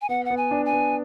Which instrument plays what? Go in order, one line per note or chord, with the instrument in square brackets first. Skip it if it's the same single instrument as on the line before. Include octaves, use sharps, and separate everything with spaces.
[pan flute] G#5
[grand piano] B3 [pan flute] F#5
[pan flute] F#5
[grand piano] B3
[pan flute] G#5
[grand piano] D4
[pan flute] G#5
[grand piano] B3